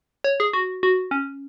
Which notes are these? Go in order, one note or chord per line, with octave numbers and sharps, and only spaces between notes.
C#5
G#4
F#4
F#4
C#4